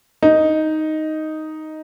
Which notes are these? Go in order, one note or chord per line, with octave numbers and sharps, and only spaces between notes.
D#4